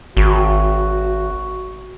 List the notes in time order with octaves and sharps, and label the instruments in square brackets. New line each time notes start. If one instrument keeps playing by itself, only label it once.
[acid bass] G#1 [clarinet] F#4